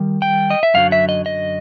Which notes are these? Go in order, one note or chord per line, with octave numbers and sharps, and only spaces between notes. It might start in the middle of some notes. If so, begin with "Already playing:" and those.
Already playing: D#3 G3
G5
D#5
E5
F#2 D3 F#3 F5
E5
D#5
D#5